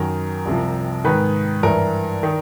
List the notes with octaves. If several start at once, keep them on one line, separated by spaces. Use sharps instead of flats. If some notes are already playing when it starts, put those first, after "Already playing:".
Already playing: F#2 D#3 A#4
C2 C3 F3
G#2 D#3 B4
G2 E3 A#4
D#3